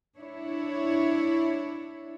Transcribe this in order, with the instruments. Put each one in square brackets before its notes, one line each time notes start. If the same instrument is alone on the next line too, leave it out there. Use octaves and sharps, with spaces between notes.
[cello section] D4 E4 C#5